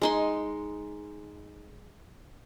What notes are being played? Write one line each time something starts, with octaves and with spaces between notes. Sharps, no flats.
G#3 D#4 C6